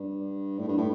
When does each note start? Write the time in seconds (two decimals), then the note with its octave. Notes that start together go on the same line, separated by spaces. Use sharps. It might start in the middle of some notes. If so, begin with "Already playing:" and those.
Already playing: G2
0.58 A2
0.68 G2
0.78 A2